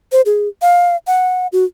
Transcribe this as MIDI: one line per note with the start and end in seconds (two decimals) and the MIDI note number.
0.12 0.21 72
0.26 0.48 68
0.62 0.96 77
1.07 1.47 78
1.52 1.65 66